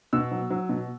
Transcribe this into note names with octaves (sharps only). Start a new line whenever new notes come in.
B2 E6
F#3
F#3
B2